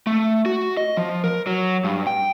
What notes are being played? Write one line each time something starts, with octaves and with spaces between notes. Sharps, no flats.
A3
F#4
D#5
F3
A#4
F#3
G2
G5